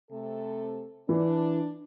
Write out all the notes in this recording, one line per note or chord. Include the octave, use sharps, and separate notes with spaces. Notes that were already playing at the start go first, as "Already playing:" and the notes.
C3 A3 A4
E3 D4